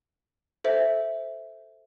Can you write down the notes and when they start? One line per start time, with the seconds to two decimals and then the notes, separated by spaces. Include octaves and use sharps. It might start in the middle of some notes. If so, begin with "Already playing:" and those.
0.64 A4 C5 E5